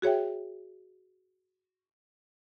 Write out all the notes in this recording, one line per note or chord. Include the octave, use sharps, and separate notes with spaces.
F#4 G#4 C#5 E5 G5